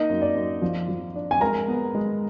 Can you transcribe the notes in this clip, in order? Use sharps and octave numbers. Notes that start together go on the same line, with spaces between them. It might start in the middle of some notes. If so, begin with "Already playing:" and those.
Already playing: A#3 D#4 D#5
F#2
D5
F#2
F3
F3
D4
G#5
G#3 A#4 A#5
B3
G#3